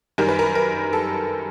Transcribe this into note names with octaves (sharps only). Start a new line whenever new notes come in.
F#2 D#3 G3 A#4
B4
A#4
A#4
A4